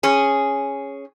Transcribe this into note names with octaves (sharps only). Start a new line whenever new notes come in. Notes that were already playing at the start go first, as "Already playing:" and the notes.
C#4 G#4